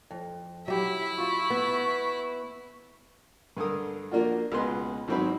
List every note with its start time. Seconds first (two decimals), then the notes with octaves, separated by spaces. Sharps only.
0.11 F2
0.68 F#3 E4 G4 E5
1.18 F4 F#4 C#6
1.50 B3
3.57 G2 D3 A#4 D#6
4.11 F3 A#3 D4 F4 F#4
4.52 C#2 B2 G#3 B4 C6
5.08 G#1 E3 F#3 C4 D#4 B5